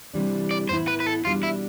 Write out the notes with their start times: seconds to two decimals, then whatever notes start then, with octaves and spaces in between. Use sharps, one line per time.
0.14 C3 E3 G3 D4
0.51 D5
0.69 A2 E3 B3 E4 C5
0.88 B4
1.00 B4
1.06 A4
1.25 B2 G3 D4 F4
1.43 E4